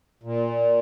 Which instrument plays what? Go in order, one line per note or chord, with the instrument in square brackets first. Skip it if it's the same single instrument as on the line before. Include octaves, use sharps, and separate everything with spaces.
[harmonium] A#2